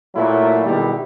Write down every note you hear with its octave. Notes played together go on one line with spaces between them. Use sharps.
A#2 F#3 A3 A#3 E4
B2 D#3 G3 G#3 E4